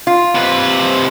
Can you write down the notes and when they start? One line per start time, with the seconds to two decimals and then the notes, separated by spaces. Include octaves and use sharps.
0.07 F4
0.35 C3 B4